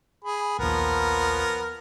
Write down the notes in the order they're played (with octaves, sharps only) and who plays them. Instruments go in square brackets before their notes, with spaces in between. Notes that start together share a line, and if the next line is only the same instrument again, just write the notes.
[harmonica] G#4 B5
[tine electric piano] A#1 D#2 [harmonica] F3 B3 A#4